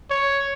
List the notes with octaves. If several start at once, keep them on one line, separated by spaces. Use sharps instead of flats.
C#5